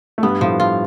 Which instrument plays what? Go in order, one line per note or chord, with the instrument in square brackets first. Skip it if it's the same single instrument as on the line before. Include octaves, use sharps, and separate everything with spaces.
[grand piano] A3
[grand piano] G2 G3 [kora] B3
[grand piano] A2 A3 [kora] F3
[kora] F4